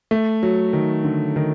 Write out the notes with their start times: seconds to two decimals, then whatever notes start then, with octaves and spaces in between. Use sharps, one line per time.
0.11 A3
0.43 F#3
0.73 D#3
1.04 D3
1.36 D#3